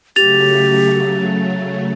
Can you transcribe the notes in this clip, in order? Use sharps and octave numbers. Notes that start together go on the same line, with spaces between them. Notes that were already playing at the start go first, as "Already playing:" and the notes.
C#3 F#3 A3 G4 A6 F7